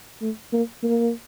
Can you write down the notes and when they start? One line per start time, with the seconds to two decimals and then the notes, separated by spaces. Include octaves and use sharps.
0.21 A3
0.53 A#3
0.83 A#3